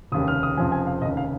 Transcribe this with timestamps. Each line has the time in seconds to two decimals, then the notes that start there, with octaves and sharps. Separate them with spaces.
0.12 F1 D#2 C#3 G3 D#6
0.28 F6
0.43 D#6
0.57 F1 F2 C#3 F3 G#5
0.72 G#5
0.87 F5
1.02 F1 D#2 C#3 D#5
1.17 F5